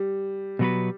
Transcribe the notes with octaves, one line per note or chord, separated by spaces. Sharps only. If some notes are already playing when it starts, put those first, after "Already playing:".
Already playing: G3
B2 F#3 B3 F#4 B4